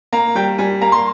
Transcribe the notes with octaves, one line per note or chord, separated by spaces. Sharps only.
A#3 A#5
G3 G5
G3 G#5
A#3 A#5
C6